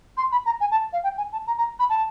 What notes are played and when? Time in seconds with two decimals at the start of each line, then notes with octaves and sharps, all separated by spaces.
0.17 C6
0.32 B5
0.46 A#5
0.61 G#5
0.71 A5
0.93 F5
1.04 G5
1.18 G#5
1.32 A5
1.47 A#5
1.58 A#5
1.79 B5
1.90 A5